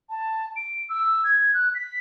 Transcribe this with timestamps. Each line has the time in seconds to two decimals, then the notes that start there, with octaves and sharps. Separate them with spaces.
0.09 A5
0.56 D7
0.89 E6
1.24 G#6
1.53 F#6
1.74 B6